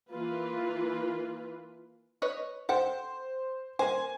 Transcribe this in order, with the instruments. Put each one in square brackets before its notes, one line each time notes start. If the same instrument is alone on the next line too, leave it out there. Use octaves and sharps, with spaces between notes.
[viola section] E3 A#3 F4 B4
[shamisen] B4 C#5 D#5
[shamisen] A4 F#5 G5 [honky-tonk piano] C5
[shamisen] A#3 C5 [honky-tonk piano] G#5